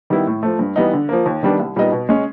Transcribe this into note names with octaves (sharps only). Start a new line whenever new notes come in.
D#3 G3 B3 E4
A2
F3 A3
G2
E3 G3 B3 D#4
D3
F3 A#3
D#2
D#3 G3 B3 D4
C2
A#2 G3 B3 D#4
B2
G#3 C#4